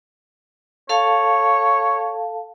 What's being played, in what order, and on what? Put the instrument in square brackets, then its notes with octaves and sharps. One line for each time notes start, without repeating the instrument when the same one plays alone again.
[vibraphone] A4 F5 A5 [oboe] C#5